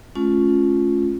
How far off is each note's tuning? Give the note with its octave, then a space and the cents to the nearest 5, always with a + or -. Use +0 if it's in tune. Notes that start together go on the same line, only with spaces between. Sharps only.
A3 -45 C#4 +0 F4 +0